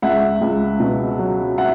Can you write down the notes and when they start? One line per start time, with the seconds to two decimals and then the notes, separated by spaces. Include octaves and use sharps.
0.02 C#2 E5 F#5
0.41 C#2
0.80 B2
1.19 F#3
1.58 E5 F#5